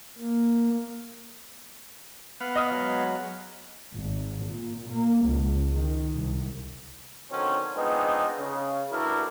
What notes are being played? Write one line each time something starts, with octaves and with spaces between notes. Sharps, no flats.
A#3
B3 F5 F#5
D#5 D#6 F6
F#3 G#3
G#1
A#2
A#3
C#2
D#3
C2
D3 D#3 F#3 C4 C#4
G#3 B3 C4 D4 D#4 F4
C#3
D2 E3 D4 E4 F#4 A#4